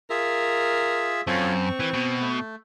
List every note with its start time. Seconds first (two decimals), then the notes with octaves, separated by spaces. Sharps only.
0.10 F4 G#4 A#4 E5
1.27 F#2 C4 F4 A4 C#5
1.66 C#6
1.80 E3
1.94 B2
2.21 A3